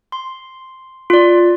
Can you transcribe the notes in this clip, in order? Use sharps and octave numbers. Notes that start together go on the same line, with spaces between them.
C6
F4 D5